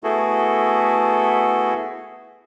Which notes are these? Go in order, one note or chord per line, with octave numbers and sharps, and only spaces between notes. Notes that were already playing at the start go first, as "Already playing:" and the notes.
A3 B3 E4 F#4 G#4 A4